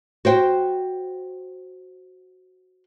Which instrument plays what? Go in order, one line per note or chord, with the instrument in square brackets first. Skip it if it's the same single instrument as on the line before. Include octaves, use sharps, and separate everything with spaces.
[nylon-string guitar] F#4 C5 G5